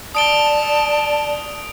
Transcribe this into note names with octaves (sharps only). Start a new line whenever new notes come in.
D5 A5 D#6 D7 G7